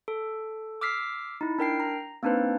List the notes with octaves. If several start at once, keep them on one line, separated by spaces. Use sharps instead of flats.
A4
D6 E6 F6 B6 C7
D#4 E4
D4 A#4 G5 C7
A#5
A#3 C4 D4 D#4 B4 C5